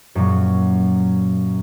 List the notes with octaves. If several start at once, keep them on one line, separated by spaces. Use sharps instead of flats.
F#2 A#2 F#3